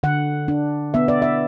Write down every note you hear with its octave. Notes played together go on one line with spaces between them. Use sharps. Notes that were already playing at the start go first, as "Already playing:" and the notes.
D3 F#5
D4
B3 E5
D5
E5